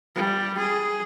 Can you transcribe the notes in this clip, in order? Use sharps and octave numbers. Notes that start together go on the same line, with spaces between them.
G3
G#4